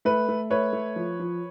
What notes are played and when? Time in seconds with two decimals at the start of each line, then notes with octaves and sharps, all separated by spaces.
0.05 A3 B4
0.28 A3
0.50 A3 B4 C#5
0.73 A3
0.96 F3
1.20 F3